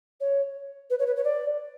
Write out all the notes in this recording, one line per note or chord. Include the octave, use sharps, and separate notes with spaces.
C#5
B4
C#5
B4
C#5
D5